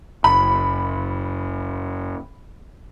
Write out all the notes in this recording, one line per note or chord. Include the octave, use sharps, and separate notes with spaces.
F#1 B5